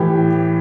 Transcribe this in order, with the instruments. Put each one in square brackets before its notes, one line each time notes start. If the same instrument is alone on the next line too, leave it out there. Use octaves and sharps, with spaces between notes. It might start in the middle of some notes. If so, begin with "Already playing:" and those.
Already playing: [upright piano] A2 E3 G4